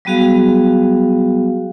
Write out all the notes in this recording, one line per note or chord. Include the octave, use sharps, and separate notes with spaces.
F#3 G3 B3 F#4 G#4 F5